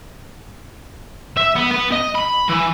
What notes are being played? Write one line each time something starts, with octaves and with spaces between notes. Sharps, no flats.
E5
B3
B3
D#5
B5
E3